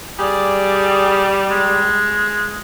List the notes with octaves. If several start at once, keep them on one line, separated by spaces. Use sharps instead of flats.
G3 G#4 D5 D6
G#3